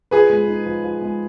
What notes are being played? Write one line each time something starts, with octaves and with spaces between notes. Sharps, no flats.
F3 G#4 B4
G#3
D#4
F3
F3
G#3